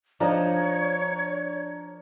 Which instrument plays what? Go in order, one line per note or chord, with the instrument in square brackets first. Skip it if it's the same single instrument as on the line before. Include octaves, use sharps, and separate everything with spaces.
[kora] F3 D#4 [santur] D4 A#4 A#5 [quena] C#5